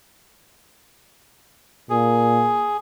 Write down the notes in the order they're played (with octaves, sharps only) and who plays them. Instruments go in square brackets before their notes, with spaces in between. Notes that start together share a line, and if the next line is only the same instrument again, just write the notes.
[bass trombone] A#2 [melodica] G#4